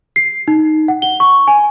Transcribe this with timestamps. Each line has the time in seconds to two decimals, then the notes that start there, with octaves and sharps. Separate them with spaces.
0.16 C7
0.48 D#4
0.88 F#5
1.02 G7
1.20 C#6
1.48 G#5